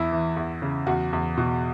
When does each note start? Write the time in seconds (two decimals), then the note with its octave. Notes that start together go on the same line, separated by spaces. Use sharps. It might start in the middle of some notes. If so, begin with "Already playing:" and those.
Already playing: E2 E4
0.12 E3
0.37 E2
0.62 C#3
0.87 E2 F#4
1.13 E2
1.37 B2